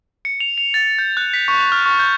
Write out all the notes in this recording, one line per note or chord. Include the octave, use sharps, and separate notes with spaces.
C#7
F7
F7
A6
G6
F#6
B6
C#6
F7
F6
C#6
G6